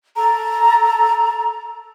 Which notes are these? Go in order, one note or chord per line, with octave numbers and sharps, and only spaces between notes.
A4 A#5